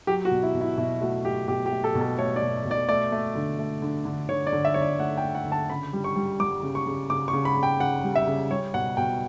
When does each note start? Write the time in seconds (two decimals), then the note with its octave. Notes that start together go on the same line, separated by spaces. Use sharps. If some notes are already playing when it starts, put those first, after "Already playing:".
0.07 F#3 G4
0.25 F#4
0.31 B2
0.43 E4
0.54 B2
0.61 E4
0.78 B2 E4
1.01 A3 F#4
1.25 A3 G4
1.48 B2 G4
1.66 G4
1.71 A3
1.84 A4
1.95 B2
2.01 A4
2.18 A3 C#5
2.36 D5
2.42 B2
2.65 B2
2.71 D5
2.89 A3 D5
3.12 A3
3.35 D3
3.59 A3
3.82 D3
4.05 D3
4.29 D3 C#5
4.47 D5
4.53 D3
4.65 E5
4.74 D3 C#5
4.82 D5
4.99 A3 F#5
5.17 G5
5.23 A3
5.35 F#5
5.46 D3
5.52 A5
5.70 C#3 B5
5.93 G3
6.04 C#6
6.16 G3
6.40 G3 D6
6.63 C#3
6.75 C#6
6.86 C#3
7.10 C#3 D6
7.28 C#6
7.33 C#3
7.45 B5
7.57 C#3
7.63 G5
7.80 C#3 F#5
8.04 G3
8.16 E5
8.27 C#3
8.50 G3 C#5
8.74 B2 F#5
8.97 B2 G5